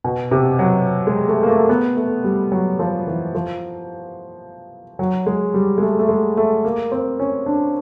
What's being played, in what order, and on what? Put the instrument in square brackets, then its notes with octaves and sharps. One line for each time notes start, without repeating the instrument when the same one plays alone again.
[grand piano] B2
C3
F#3
G#3
A3
A#3
A3
B3
A3
G3
F#3
F3
E3
F3
F#3
G#3
G3
G#3
A3
A3
G#3
A3
A#3
C4
C#4
D4